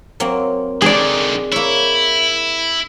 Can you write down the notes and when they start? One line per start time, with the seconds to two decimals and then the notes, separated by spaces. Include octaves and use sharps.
0.20 F#3 A#3 C4
0.82 D3 D#3 G#4 D5
1.52 A#3 E4 C#5